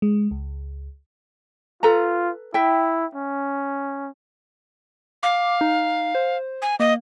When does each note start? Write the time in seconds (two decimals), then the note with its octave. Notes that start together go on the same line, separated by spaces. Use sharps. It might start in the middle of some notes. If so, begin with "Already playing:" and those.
0.02 G#3
0.31 C#2
1.83 F4 A4 B4 A#5
2.54 E4 E5 G5
3.15 C#4
5.23 F5 D6
5.61 D#4
6.15 C5
6.62 G#5
6.80 A#3 D#5